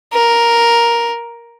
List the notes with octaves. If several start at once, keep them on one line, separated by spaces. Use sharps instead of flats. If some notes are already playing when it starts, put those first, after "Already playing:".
A#4